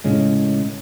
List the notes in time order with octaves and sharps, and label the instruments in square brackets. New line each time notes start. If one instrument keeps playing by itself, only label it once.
[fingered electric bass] A2 C#3 G#3